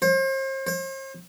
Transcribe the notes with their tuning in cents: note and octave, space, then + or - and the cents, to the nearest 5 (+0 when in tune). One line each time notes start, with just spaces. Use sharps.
C5 +40
C5 +45